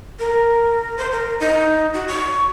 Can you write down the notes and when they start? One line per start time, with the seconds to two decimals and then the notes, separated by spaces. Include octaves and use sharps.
0.19 A#4
0.98 C5
1.12 A#4
1.40 D#4
1.94 F#4
2.08 C#6